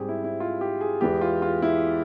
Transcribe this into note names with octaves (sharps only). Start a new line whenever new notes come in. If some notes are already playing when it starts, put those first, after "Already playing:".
Already playing: G#2 G3 C4 G4 G#4
E4
E4
F4
G4
G#4
E2 E3 G#3 G4
F4
F4
E4